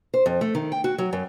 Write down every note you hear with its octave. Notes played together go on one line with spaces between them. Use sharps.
C5
F2
A3
D#3
G5
F#4
F#3
F#2